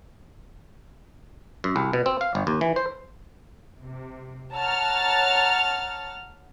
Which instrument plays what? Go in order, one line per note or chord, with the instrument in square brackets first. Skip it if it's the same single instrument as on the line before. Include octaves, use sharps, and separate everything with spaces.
[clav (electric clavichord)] F#2
C2
B2
C4
F5
G1
D#2
E3
C5
[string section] C3
C#5 F#5 A5 A#5 F6 A6